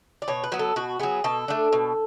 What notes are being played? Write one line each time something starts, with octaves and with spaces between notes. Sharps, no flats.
D5
B2 C#5
B4
F#3 B3
A4
B2 F#4
F#3 B3 G#4
B2 A4
A3 D4
B2